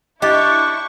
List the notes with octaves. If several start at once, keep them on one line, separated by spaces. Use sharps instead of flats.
D4 E4 G4 D#5 C#6 A6